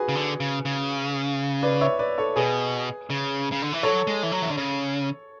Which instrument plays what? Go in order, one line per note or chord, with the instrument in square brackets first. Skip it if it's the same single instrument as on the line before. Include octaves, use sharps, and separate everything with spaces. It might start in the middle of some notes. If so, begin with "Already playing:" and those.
Already playing: [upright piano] F#4 G#4 B4
[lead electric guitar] C#3
D3
C#3
C#3
[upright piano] B4 D5
C#5 E5
B4 D5
A4 C#5
[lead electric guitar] B2 [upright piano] G#4 B4
[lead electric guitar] C#3
C#3
D3
E3
[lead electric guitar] F#3 [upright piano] A4 C#5
[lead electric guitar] G#3
E3
F#3
E3
D3
C#3